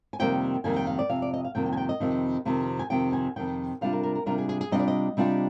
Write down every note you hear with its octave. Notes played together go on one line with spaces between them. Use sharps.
G#5
F2 C3 D#3 G3 A#3 G5
F2 C3 D#3 G3 A#3 G#5
G5
F5
D5
F2 C3 F5
D5
D#5
F5
F2 C3 D#3 G3 A#3 G5
G5
G#5
G5
D#5
F2 C3 D#3
F2 C3 D#3
G#5
F2 C3 D#3 G5
G#5
F2 C3 D#3 G5
C3 G3 D4 F4 F5
A#4
A#4
A#4
C3 G3 D4 F4 A#4
G#4
G#4
G#4
C3 G3 D4 F4 D#5
D5
D#5
C3 G3 D4 F4